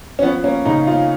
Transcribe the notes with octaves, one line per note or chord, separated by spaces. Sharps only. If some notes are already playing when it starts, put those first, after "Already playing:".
C#4
F3 B3
A#3 C#4
C#3 D#4
A#3 F4